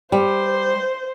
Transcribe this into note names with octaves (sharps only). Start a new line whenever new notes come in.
G3 C5